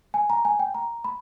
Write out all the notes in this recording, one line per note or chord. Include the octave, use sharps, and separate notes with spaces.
G#5
A#5
G#5
G5
A#5
B5